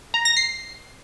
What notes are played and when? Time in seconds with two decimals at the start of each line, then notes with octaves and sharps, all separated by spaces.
0.14 A#5
0.25 A#6
0.37 C7